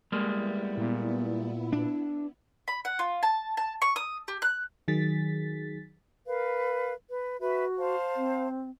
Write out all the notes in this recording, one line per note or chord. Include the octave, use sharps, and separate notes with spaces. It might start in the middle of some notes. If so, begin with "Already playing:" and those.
G3 G#3 A#3 B3 E4
A#2
D4
B5
F#5
F4
A5
A5
C#6
D#6
G4
F#6
D#3 F#3 G#4 A6 B6
A#4 B4 F5
B4
F#4 B4 E5
C5 F5 A5
C4